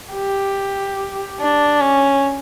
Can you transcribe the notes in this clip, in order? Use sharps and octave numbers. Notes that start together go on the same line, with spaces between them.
G4
D4
C#4